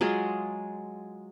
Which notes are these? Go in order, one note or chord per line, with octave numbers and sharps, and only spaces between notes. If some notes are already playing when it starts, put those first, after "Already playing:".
F#3 G#3 F4 G#4